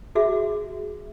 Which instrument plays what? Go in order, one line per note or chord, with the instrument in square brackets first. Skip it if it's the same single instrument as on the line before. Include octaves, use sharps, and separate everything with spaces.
[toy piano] F#4 G#4 E5